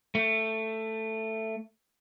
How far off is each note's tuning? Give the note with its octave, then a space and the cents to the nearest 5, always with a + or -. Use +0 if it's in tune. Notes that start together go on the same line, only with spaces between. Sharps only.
A3 +10